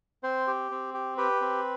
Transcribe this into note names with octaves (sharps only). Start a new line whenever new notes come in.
C4 C5
G4
C4
G4
G4 B4
C4